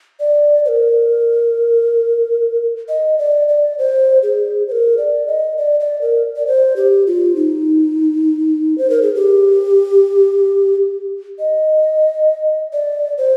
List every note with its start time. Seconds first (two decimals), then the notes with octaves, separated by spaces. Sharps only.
0.20 D5
0.65 C5
0.68 A#4
2.89 D#5
3.19 D5
3.48 D5
3.78 C5
4.23 G#4
4.68 C5
4.72 A#4
4.98 D5
5.27 D#5
5.58 D5
5.80 D5
6.02 A#4
6.36 D5
6.47 C5
6.76 G4
7.07 F4
7.36 D#4
8.78 C5
8.90 A#4
9.02 G#4
9.15 G4
11.39 D#5
12.73 D5
13.18 C5